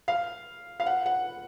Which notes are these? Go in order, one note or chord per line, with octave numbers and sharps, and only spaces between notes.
F5
F5
F#5
F#5